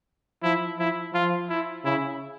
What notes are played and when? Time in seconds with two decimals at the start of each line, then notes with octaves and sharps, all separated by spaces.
0.43 F3 E4
0.79 F3 E4
1.13 F3 F4
1.49 E4
1.85 C#3 E4